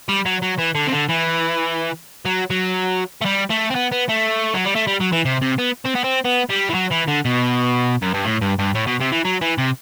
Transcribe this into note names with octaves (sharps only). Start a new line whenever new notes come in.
G3
F#3
F#3
E3
D3
C3
D3
E3
F#3
F#3
A3
G3
A3
C4
B3
B3
A3
F#3
G3
A3
G3
F#3
E3
C3
C3
B3
C4
B3
C4
B3
G3
E3
F#3
E3
D3
B2
F#2
G2
A2
G2
G2
A2
B2
C3
E3
F#3
E3
C3